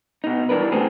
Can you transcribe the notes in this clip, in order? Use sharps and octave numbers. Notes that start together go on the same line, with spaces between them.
B2 D#4
E3 G3 D4 A#4 B4
A2 C#3 A3 C4 G#4